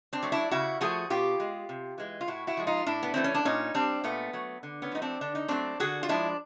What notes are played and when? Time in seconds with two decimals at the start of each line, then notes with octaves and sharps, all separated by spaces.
0.13 C4 D4
0.23 F#3 A3
0.32 D4 E4
0.51 C#3 E4 F#4
0.81 F3 A3 F#4 G#4
1.10 B2 F4 G4
1.40 G#3
1.69 C3
1.98 E3 G#3
2.21 F4
2.28 A2 E4 F#4
2.47 E4 F#4
2.57 F3 G#3
2.67 D#4 F4
2.87 A2 D4 E4
3.03 B3
3.14 E3 A3 C4
3.24 C#4
3.34 D4
3.45 A#2 C#4 D#4
3.74 G3 C4 D4
4.04 A#2 A3 B3
4.33 F#3 A3
4.63 D3
4.82 B3 C#4
4.92 F3 A3 D#4
5.02 C4 D4
5.21 D3 D4
5.35 D#4
5.48 F#3 A3 C4 D4
5.80 D3 F#4 G#4
6.03 F4
6.09 F3 G#3 D4 E4